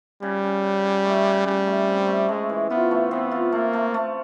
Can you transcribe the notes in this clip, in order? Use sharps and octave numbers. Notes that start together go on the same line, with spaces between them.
C#3 G3
C#3
C#3
C#3
A3
C#3
C#3 G3
A3
C4
A3
G#3 A3
E3
B3 F4
A3
B3 C4
F4
A3 A#3
A3
A3